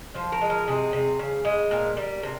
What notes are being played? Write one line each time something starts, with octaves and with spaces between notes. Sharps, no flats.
F3 C5
A#4
G#3
A#4
C3 G#4
C3
C#3
G#3
A#2 A#4
G3
C3